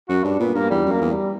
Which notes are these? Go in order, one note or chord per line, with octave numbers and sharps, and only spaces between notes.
F#2 F#4
G2 D4
A#2 B3
G2 A#3
E2 G3
F#2
A#3
E2
G3